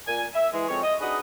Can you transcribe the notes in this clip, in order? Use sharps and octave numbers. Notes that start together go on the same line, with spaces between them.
A#2 G#5
E5
E3 G#3
F3 G#3 C4 A4 C#5
D#5
D4 D#4 F#4 G#4 B4 D#5